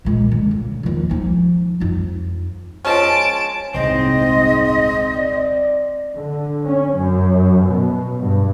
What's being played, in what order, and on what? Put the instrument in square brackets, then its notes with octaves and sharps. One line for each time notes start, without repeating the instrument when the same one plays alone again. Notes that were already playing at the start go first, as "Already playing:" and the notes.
[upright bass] A#2 G#3
D3
C#3
D#2 F3
F3 D#4
F2 D#4
[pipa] F3 G#3 C#4 [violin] A5 D7
[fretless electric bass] D#1 C2 [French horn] G#2 [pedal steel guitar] C4 [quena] D#5
[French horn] D5
[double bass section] D3
C#4
F#2
B2
G2